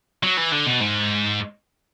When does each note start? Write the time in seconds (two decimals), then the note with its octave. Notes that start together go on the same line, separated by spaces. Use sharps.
0.23 F#3
0.37 E3
0.52 D3
0.66 B2
0.80 G#2